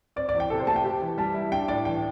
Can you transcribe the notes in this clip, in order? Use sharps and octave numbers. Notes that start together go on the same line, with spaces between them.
C4 D5
D5
E2
G5
C3 A4
C5
A3 A5
G5
G4
E3
G3 A5
E4
D4 G5
A2 D5
E3 G5